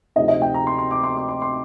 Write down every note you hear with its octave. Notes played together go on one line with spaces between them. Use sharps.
D2 C3 F3 C4 D#4 D#5
D#5
G5
A#5
C6
C6
D6
C6
D6
C6
C6